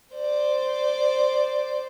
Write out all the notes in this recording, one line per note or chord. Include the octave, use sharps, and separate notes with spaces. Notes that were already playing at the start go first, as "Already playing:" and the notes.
C5 D5